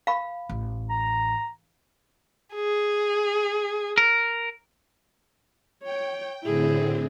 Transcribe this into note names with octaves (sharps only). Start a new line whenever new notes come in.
F5 B5
A1
A#5
G#4
A#4
C#5 G5
A2 D3 C4 E4 G#4